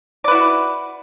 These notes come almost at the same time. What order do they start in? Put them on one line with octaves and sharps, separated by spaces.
D5 B4 E4 F#4